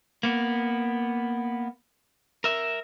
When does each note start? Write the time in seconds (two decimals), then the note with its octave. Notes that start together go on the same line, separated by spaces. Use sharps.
0.23 A#3 B3
2.44 A#4 E5